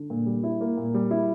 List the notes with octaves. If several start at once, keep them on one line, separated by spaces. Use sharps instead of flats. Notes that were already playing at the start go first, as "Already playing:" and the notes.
Already playing: D3
A#2
G3
E4
A#3
A#2
G3
E4